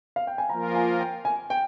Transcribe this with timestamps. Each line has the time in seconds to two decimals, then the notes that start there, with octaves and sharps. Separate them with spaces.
0.16 F5
0.27 G5
0.38 G#5
0.49 F3 A#3 F4 A#4 A#5
0.75 G#5
1.00 G5
1.25 G#5
1.50 G5